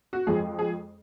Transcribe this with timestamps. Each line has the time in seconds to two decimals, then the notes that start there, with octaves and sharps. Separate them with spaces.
0.13 F#4
0.27 F2 F3 G#3 G#4
0.59 G#4